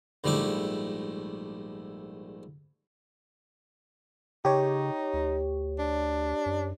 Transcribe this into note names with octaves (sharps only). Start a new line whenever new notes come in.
A#1 G#2 G3 A3 E4 D6
C#3 D#4 G4 C#5
D2
D4
F#2